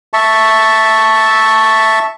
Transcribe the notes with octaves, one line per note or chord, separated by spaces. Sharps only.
E5 A5 C#6